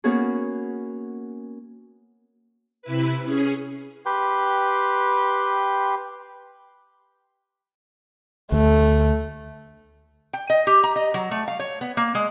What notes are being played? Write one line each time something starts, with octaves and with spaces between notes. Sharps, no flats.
A#3 B3 C#4 F#4 G#4
C3 E4 B4
C#4 G#4
G4 B4 G5 C6
D2 A3
G5
D#5
G4
A#5
D#5
F#3
A3
F5
C#5
B3
A#3
G#3